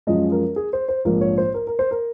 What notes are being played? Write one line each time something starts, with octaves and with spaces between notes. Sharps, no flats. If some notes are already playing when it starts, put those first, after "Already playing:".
F#2 F3 G#3 D#5
A#4
G#4
C5
C5
A#1 G#2 F3 A#4
C#5
C5
A#4
A#4
C5
A#4